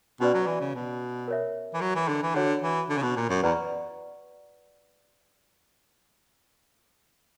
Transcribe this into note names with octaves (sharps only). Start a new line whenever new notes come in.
B2 C#4 F#4 B4 D5
F#3
E3
C#3
B2
A#4 C#5 E5
E3
F#3
E3
D3
E3
D3 F#4 C#5 F#5
E3
D3
C#3
B2
A#2
F#2
E2 B4 D5 F#5 A#5 C#6